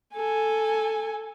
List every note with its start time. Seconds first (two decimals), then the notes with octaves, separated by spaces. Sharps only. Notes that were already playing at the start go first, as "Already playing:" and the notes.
0.15 A4 G#5